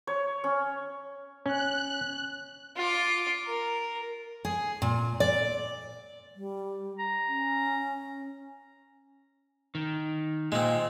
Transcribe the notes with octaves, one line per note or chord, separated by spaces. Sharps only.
C#5
C#4
C#4 F#6
F4 D6
A#4
G#4
A#2
D5
G3
A#5
C#4
D#3
A#2 G#3 C4